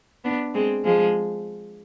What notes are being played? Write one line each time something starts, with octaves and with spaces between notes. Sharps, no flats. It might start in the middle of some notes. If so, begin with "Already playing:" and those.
B3 D4
G#3 C4
F3 G#3